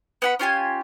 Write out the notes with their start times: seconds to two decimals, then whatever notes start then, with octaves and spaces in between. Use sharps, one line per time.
0.22 B3 F#5 B5
0.39 C#4 F4 G4 G#5